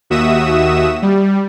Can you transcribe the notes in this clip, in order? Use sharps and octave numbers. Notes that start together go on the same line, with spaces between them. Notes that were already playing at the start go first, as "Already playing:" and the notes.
D#2 F#4 E5 D#6 E7
G3